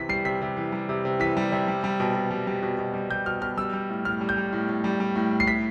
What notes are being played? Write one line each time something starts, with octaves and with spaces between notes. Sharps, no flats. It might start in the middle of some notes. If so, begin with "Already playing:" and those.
Already playing: C3 E3 B6
G3 C7
C3 B6
C3
E3
G3
C3
C3
E3 B6
G3
C3
G3
G3
B2
B2
G3
G3
B2
B2
G3
G3 G6
B2 F6
B2 F6
G3 E6
G3
A2
A2 F6
G3
G6
G3
A2
A2
G3
G3
A2
A2
C7
A2 B6